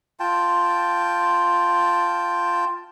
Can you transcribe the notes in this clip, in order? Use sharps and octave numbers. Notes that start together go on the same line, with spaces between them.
F4 G5 A5